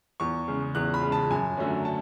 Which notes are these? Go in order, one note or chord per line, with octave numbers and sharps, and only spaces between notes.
E2 C#6
C#3 G#3
E2 F#6
B5
C#3 G#3
A5
F#2 G#5
D3 F#3 A3 C#4
A5